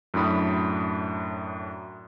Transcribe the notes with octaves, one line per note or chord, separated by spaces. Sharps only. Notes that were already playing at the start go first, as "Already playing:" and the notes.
F#2 A2 D4 B5 D#6